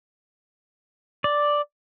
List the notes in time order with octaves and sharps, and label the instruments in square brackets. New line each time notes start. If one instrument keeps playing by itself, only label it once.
[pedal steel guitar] D5